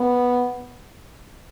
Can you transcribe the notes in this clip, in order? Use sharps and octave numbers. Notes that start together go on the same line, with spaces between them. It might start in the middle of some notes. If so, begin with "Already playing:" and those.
Already playing: B3